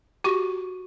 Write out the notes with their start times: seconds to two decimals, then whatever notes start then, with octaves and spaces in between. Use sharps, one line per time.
0.24 F#4 G4 C#6